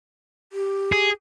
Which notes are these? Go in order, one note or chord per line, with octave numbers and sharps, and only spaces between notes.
G4
G#4